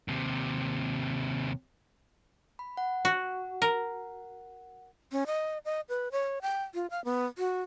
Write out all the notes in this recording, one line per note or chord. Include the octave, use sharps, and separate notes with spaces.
D#2 C3
B5
F#5
F#4
A#4
C#4
D#5
D#5
B4
C#5
G5
F4
F5
B3
F#4